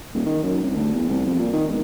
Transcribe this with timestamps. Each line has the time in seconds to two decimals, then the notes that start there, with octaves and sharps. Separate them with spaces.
0.14 D#1
0.26 D#3
0.43 F#2
0.63 C2
0.76 D2
0.94 E2
1.09 C2
1.26 F2
1.39 A#2
1.53 D#3
1.68 E1